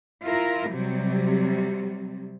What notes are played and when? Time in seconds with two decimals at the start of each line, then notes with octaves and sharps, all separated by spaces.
0.24 E4 F4 A#4
0.70 C3 F#3 G3